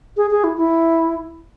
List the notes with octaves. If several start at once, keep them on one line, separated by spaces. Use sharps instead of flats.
G#4
G#4
E4
E4